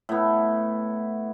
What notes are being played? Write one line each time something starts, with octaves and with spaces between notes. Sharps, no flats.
A2 B3